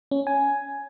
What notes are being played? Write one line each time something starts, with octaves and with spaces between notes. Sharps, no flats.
C#4
G#5